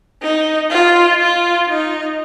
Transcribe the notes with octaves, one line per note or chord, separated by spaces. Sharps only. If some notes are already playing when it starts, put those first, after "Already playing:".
D#4
F4
F4
D#4